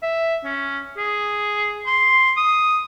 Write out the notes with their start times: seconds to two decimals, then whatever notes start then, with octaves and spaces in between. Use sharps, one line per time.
0.03 E5
0.44 C#4
0.98 G#4
1.87 C6
2.37 D#6